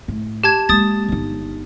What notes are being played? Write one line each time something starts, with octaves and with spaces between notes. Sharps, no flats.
A2
G4 A5 G#6
G#3 A#3 D#6 A6
G1 D#4